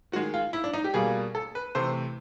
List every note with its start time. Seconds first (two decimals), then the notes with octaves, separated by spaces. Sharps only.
0.12 D#3 F#4
0.16 G#3
0.34 F4
0.53 E4
0.64 D4
0.74 D#4
0.84 G4
0.94 B2 G3 A#3 G#4
1.35 A4
1.55 B4
1.75 C3 E3 A3 C5